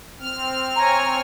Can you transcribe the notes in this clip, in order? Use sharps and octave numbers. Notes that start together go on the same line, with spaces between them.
C4 F6
C#5 G#5 A#5